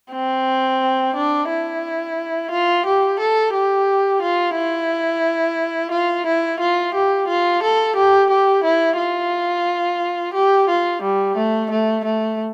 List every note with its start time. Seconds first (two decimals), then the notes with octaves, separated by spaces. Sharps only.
0.13 C4
1.15 D4
1.50 E4
2.51 F4
2.86 G4
3.19 A4
3.54 G4
4.22 F4
4.56 E4
5.91 F4
6.26 E4
6.60 F4
6.94 G4
7.28 F4
7.63 A4
7.96 G4
8.30 G4
8.64 E4
8.98 F4
10.34 G4
10.69 F4
11.02 G3
11.36 A3
11.71 A3
12.04 A3